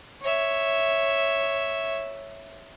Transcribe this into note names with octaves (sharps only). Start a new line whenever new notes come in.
C#5 E5